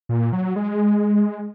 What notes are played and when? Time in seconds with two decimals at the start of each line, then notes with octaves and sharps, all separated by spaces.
0.09 A#2
0.33 F#3
0.56 G#3